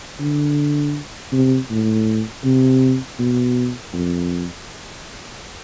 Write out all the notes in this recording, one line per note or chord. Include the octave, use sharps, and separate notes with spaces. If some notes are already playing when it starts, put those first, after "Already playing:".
D3
C3
A2
C3
B2
F2